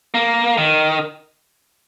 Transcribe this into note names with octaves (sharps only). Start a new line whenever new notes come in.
A#3
D#3